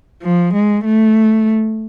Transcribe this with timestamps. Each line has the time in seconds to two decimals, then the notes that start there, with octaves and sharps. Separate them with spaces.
0.22 F3
0.54 G#3
0.84 A3